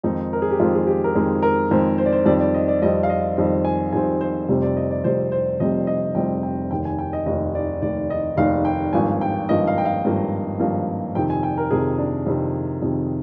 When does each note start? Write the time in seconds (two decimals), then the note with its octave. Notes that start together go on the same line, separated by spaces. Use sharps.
0.03 F2 D#3 G#3 C4 D#4
0.33 A#4
0.42 G#4
0.51 G4
0.60 F2 D#3 G#3 C4 F4
0.75 G#4
0.87 G4
1.04 A#4
1.15 F2 D#3 G#3 C4 G#4
1.42 A#4
1.71 F2 D#3 G#3 C4 C5
1.98 C5
2.05 D5
2.12 C5
2.26 F2 D#3 G3 C4 D5
2.40 D5
2.54 D#5
2.68 D5
2.82 F2 D#3 G3 C4 D#5
3.03 F5
3.10 D#5
3.37 F2 D#3 G3 C4
3.65 G#5
3.93 F2 D#3 G3 C4 G#5
4.21 C5
4.48 F1 F2 C3 G3 C4 C5
4.62 D5
4.77 D#5
4.91 D5
5.04 F1 F2 C3 G3 C4 C5
5.32 C5
5.59 F1 F2 C3 G3 C4 D#5
5.87 D#5
6.15 F1 F2 C3 G3 C4 G5
6.43 G5
6.71 F1 D#2 D#3 G5
6.85 G#5
6.98 G5
7.13 D#5
7.26 F1 D#2 D#3 D#5
7.55 D5
7.82 F1 D#2 D#3 D5
8.10 D#5
8.37 F1 D#2 D#3 F5
8.65 G5
8.93 G#1 G2 F3 A#3 G#5
9.21 G5
9.48 G#1 G2 F3 A#3 D#5
9.67 F5
9.78 G5
9.85 F5
10.04 G#1 G2 F3 A#3
10.60 G#1 G2 F3 A#3
11.15 F2 C3 D#3 G5
11.30 G#5
11.43 G5
11.58 A#4
11.71 F2 C3 D#3 G#4
11.98 D4
12.27 F2 C3 D#3
12.82 F2 C3 D#3